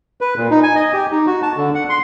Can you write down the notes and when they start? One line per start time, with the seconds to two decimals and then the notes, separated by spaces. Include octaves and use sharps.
0.21 B4
0.37 A#2
0.51 D#4
0.63 G#5
0.75 D#5
0.93 G4
1.12 D#4
1.27 F#4
1.42 A5
1.57 D3
1.75 F#5
1.89 C6